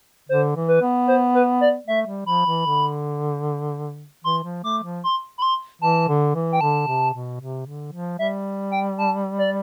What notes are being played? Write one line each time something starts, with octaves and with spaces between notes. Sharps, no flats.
D3 C5
E3
B4
B3
C5
B4
D5
A3 E5
G3
F3 B5
E3
D3
E3 C6
F3
A3 D6
F3
C6
B5
C6
E3 A5
D3
E3
G5
D3 A5
C3
B2
C3
D3
F3
G3 E5
G5
A5
D5